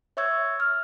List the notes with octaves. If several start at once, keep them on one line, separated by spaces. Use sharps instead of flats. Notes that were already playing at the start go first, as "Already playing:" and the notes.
C#5 E5 C#6 E6 G#6
F6